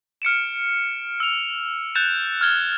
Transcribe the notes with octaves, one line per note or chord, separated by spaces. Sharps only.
F6 C#7 D7 E7
E6 F7
F#6 G6 A6 E7 F7
F6 G#6 G7